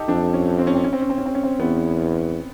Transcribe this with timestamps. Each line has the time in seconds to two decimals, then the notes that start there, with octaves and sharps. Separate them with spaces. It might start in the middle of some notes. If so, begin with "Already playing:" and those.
Already playing: D#4 G4 A4
0.08 F2 D4
0.34 C#4
0.59 C4
0.67 C#4
0.75 C4
0.84 C#4
0.93 C4
1.01 C#4
1.10 C4
1.18 C#4
1.26 C4
1.35 C#4
1.44 C4
1.60 E2 B3